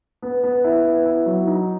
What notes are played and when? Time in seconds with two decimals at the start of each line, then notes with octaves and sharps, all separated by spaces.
0.22 B3
0.43 B3
0.64 E4
0.85 B3
1.06 E4
1.26 F#3
1.47 D#4